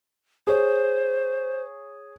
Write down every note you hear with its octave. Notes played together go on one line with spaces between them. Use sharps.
G#4 C5 C#5